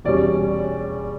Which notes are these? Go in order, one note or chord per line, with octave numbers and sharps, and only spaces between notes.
E2 B2 G3 C#4 D5